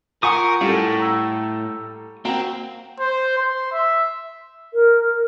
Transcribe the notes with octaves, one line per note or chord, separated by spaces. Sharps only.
F4 A#4 F#5 G#5 A#5 C#6 D#6
A2 G3 A4 F5
A#5 E6
A#3 C4 F#4 F5 G5 A#5
C5
C6
E5
A#4